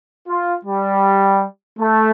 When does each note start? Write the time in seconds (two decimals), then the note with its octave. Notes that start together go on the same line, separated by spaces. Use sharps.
0.28 F4
0.65 G3
1.79 A3